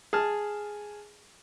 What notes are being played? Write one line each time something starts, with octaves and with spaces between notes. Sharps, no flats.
G#4 A5 F6